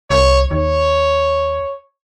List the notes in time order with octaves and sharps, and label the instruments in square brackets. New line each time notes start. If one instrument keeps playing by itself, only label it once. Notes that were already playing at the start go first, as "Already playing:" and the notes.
[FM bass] C2 [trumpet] C#5
[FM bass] D#2 [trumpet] C#5